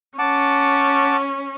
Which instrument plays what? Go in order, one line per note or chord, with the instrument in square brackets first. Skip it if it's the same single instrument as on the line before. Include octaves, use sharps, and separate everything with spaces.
[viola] C#4 [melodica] F#5 A5 D6